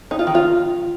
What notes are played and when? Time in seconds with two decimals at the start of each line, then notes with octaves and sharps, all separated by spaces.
0.11 D#4
0.19 F4
0.27 D#3
0.35 F4